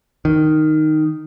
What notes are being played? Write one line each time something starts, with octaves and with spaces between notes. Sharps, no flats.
D#3